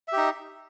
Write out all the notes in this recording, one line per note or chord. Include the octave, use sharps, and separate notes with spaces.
D#4 G4 E5